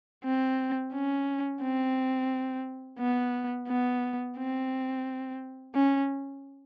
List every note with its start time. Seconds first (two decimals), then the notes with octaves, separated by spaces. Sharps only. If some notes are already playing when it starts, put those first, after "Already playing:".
0.24 C4
0.93 C#4
1.62 C4
2.99 B3
3.68 B3
4.37 C4
5.75 C#4